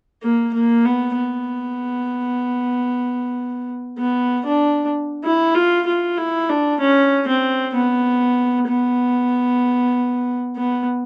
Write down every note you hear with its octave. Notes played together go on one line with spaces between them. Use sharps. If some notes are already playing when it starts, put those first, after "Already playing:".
A#3
A#3
B3
B3
B3
D4
E4
F4
F4
E4
D4
C#4
C4
B3
B3
B3